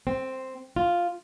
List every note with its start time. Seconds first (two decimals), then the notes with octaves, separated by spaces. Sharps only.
0.07 C4
0.76 F4